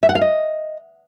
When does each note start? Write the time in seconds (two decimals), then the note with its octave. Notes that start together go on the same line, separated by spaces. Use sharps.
0.03 E5
0.09 F#5
0.15 F5
0.21 D#5